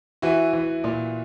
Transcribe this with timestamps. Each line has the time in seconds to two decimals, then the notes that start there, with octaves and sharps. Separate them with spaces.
0.22 E3 E4 F#4
0.53 E3
0.84 A#2